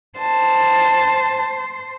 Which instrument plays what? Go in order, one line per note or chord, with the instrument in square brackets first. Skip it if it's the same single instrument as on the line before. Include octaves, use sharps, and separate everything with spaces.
[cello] C5 [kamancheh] A5